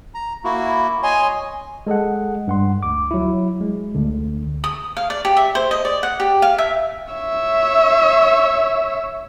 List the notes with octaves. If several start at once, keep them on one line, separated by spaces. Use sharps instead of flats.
A#5
A#3 E4 F#4
C#5 D#5 G#5 C6
G#3 A4 D#5 F#5
G2 F#5 C6
D2 D6
F#3 E4
G#3
D2 D3
D#6
F5
D5
G4
E5
C5
D#5
D5
F#5
G4
F5
E5
C#5 E5